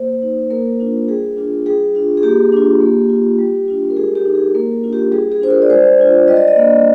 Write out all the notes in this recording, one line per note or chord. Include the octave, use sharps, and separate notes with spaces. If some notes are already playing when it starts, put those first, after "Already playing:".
Already playing: A#3 C5
D#4
A#3 A#4
D4 F4
G3 G#4
D4 F4
G3 G#4
D4 F4
G#4
A#3 G4
D4 F4
A#3
F4
G3
D4 F4
A#4
G#3 G#4
G4
D#4
G#4
A#3 A#4
D4 F4
G4
G3 G#4
G#4
D4 F4 C5
A#4
D5
G#3 C5
D4 F4
G3 D#5
D5
D#5
A#3 D4